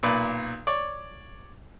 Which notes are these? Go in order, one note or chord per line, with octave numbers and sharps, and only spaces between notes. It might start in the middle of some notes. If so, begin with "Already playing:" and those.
B1 A#2 B4 D5
C#5 D5